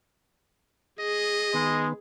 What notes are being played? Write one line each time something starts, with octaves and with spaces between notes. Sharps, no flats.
G#4 D#5
D#3 G#3 B3